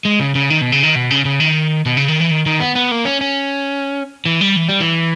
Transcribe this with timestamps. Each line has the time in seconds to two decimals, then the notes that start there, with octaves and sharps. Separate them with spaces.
0.05 G#3
0.20 C#3
0.35 C#3
0.50 D#3
0.61 B2
0.72 C#3
0.83 D#3
0.95 B2
1.11 C#3
1.25 C#3
1.40 D#3
1.86 B2
1.97 C#3
2.08 D#3
2.20 E3
2.31 D#3
2.46 D#3
2.60 B3
2.75 B3
2.91 A#3
3.05 C#4
3.21 C#4
4.26 E3
4.41 G3
4.56 E3
4.69 G3
4.80 E3